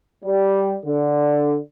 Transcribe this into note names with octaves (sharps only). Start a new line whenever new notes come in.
G3
D3